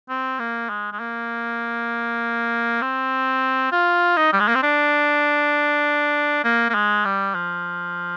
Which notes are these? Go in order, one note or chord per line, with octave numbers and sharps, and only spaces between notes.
C4
A#3
G#3
G#3
A#3
C4
F4
D#4
G3
G#3
A#3
C4
D4
A#3
A#3
G#3
G3
F3